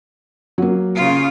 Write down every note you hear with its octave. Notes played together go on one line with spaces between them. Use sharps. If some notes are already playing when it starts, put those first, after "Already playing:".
F#3 A#3
C#3 F4